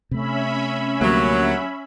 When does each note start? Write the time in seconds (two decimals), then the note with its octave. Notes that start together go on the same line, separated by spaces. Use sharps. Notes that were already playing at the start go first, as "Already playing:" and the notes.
0.11 C3 A3 C#4 E5 B5
1.01 D2 F#3 G3 A#3